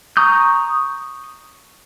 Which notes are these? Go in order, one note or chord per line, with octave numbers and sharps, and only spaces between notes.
A#5 C#6 D#6 G6